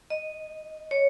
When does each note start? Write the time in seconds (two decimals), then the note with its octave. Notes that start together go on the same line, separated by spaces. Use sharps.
0.10 D#5
0.91 C#5